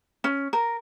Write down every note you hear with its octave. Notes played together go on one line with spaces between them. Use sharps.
C#4
A#4